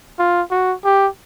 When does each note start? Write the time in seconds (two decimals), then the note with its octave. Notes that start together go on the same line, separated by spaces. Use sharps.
0.19 F4
0.51 F#4
0.84 G4